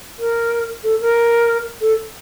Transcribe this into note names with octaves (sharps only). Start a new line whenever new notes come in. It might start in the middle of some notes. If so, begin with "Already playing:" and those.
A#4
A4
A#4
A4